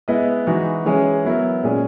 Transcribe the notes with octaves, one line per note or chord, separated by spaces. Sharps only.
G#3 B3 E4 B4 D#5
E3 G#3 D#4 F#4
E3 G#3 C#4 G#4 C#5
F#3 B3 E4 A#4
A#2 G#3 C#4 G#4